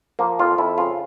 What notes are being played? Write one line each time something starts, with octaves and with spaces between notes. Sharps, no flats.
F3 A#3
F2 F4
F2 E4
C#3 F4